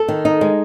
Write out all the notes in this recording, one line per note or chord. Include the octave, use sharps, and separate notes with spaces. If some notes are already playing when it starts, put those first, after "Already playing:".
Already playing: A4
D#3
D#4
G#3